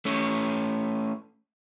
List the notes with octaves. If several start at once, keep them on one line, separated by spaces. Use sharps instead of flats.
A3 C#4